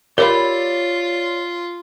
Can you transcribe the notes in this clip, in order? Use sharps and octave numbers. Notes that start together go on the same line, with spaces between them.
F4 G4 A#4 C#5 D5 F5 B5 E6